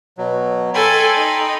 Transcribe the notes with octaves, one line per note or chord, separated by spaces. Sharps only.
B2 F#3
A4 G5 G#5 B5 C6
D#4